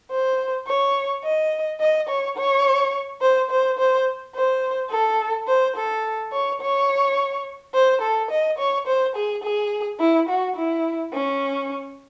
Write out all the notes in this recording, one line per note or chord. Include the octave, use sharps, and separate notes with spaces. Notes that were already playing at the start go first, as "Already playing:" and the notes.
C5
C#5
D#5
D#5
C#5
C#5
C5
C5
C5
C5
A4
C5
A4
C#5
C#5
C5
A4
D#5
C#5
C5
G#4
G#4
E4
F#4
E4
C#4